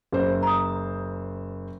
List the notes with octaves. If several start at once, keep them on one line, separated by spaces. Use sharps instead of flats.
F#1 C5
A#5 D#6